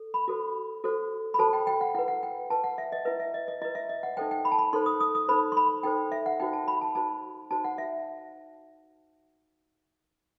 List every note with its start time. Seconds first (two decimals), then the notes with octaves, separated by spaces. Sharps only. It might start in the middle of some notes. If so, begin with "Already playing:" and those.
Already playing: A4
0.14 B5
0.28 F#4 A4 C5
0.84 F#4 A4 C5
1.34 B5
1.39 F#4 A4 C5 A5
1.53 G5
1.67 G5
1.81 F#5
1.95 E4 B4 F#5
2.08 F#5
2.23 G5
2.50 E4 B4 A5
2.64 F#5
2.78 E5
2.92 D#5
3.05 E4 B4 E5
3.20 E5
3.34 D#5
3.48 D#5
3.62 E4 B4 D#5
3.75 E5
3.89 D#5
4.03 F#5
4.17 D#4 A4 C5 G5
4.31 G5
4.45 B5
4.52 A5
4.58 B5
4.73 D#4 A4 C5 C6
4.86 D#6
5.00 D#6
5.15 D#6
5.29 D#4 A4 C5 B5
5.52 C6
5.57 B5
5.83 D#4 A4 C5 G5
6.12 E5
6.26 F#5
6.40 D#4 F#4 C5 G5
6.53 A5
6.68 B5
6.81 A5
6.95 D#4 F#4 C5 A5
7.51 D#4 F#4 C5 A5
7.65 F#5
7.78 E5